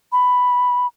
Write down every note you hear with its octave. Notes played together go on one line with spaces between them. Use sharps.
B5